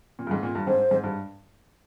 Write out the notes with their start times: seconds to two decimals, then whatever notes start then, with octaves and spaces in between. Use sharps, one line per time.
0.19 A#2
0.27 G2
0.31 G#2
0.43 A#2
0.55 G2
0.67 G#2 C5
0.91 G#2
1.04 G2